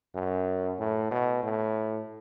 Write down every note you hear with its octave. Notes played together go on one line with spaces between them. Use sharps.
F#2
A2
B2
A2